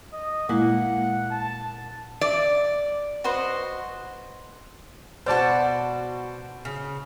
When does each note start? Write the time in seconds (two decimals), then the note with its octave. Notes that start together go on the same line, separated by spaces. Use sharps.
0.13 D#5
0.49 A#2 G#3 A#3 E4 F#5
1.31 A5
2.21 D5
3.24 F#4 B4 C5 D#5
5.26 B2 F#4 C5 D5 A5
6.65 C#3